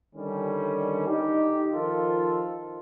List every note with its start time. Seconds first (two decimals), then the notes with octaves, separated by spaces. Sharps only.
0.14 D3 D#3 G3 C#4
1.07 D#4 G4
1.73 D#3 F3 F4 A4